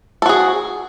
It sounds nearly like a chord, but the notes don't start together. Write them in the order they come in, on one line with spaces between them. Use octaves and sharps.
A4 F#4 G#4